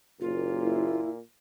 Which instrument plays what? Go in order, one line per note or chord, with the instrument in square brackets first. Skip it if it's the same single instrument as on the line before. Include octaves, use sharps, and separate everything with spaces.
[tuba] F#1 [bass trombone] A#2 [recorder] F4
[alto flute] E4